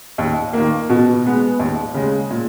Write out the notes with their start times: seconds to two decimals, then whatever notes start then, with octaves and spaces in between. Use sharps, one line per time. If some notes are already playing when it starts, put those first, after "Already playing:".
0.18 D#2
0.53 D#3 A#3
0.89 B2
1.25 G#3 B3
1.59 D#2
1.94 C#3 G#3
2.30 A#2